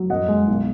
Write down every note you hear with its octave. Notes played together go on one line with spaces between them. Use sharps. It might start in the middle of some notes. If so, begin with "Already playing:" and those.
Already playing: F#3
F#2 D#5 F#5
G#3
B1